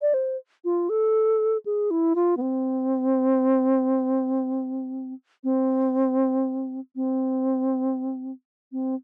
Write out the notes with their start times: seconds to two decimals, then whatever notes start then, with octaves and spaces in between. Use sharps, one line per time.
0.02 D5
0.14 C5
0.65 F4
0.89 A4
1.65 G#4
1.91 E4
2.15 F4
2.37 B3
2.41 C4
5.44 C4
6.96 C4
8.72 C4